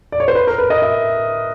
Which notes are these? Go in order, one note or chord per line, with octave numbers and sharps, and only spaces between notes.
D5
C#5
C5
B4
A#4
B4
D#5
E5